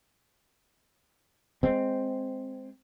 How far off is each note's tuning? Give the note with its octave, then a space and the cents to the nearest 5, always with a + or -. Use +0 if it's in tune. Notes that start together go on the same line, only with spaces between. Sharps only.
G#3 +0 C4 +0